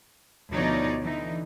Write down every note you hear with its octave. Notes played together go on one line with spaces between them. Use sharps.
D2 B2 F3 D#4 C#5 D5
D3 E3 D#4